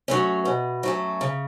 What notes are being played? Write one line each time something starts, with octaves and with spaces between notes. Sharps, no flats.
F#3 A3 C#4
B2
F#3 A3 C#4
C#3